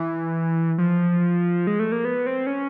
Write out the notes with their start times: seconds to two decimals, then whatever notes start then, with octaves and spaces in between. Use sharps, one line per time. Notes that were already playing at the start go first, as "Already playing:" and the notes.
Already playing: E3
0.78 F3
1.67 G#3
1.79 A3
1.92 A#3
2.05 B3
2.27 C4
2.46 C#4